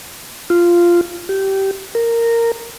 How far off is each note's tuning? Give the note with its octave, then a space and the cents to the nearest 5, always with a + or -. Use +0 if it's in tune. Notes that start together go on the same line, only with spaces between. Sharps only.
F4 -10
G4 -20
A#4 -10